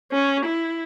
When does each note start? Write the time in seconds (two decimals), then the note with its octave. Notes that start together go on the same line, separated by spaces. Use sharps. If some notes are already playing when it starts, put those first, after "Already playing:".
0.12 C#4
0.45 E4